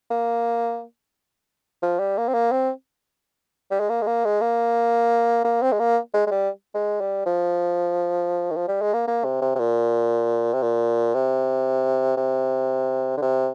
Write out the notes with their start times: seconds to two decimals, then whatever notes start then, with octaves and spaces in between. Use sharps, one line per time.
0.11 A#3
1.83 F3
1.99 G3
2.18 A#3
2.28 C4
2.34 A#3
2.52 C4
3.71 G3
3.80 G#3
3.89 A#3
4.02 G#3
4.07 A#3
4.25 G#3
4.41 A#3
5.44 A#3
5.62 C4
5.72 G#3
5.79 A#3
6.14 G#3
6.27 G#3
6.31 G3
6.75 G#3
7.01 G3
7.26 F3
8.51 D#3
8.56 F3
8.68 G3
8.82 G#3
8.94 A#3
9.08 A#3
9.24 C3
9.42 C3
9.55 C3
9.59 A#2
10.54 C3
10.62 A#2
11.15 C3
12.17 C3
13.17 D3
13.22 C3